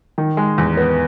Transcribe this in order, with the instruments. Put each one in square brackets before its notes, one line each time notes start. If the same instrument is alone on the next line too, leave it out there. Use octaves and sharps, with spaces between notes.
[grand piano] D#3
G#3
E2
B3